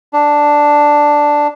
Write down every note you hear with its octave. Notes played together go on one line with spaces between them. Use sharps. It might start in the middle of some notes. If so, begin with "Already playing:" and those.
D4